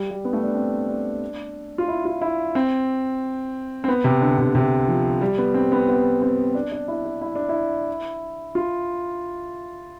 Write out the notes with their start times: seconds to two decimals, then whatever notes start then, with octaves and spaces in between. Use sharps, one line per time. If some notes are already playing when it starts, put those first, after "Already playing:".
Already playing: G3
0.11 G3
0.25 B3
0.33 A3
0.44 D4
0.55 C4
0.88 D4
1.78 F4
1.88 E4
2.05 F4
2.22 E4
2.55 C4
3.84 C4
3.88 B3
4.04 C3
4.21 D3
4.38 C3
4.55 C3
4.88 F3
5.21 G3
5.38 B3
5.54 C4
5.72 B3
5.88 B3
6.22 C4
6.55 D4
6.72 D4
6.88 E4
7.05 D4
7.21 E4
7.35 D4
7.49 E4
8.55 F4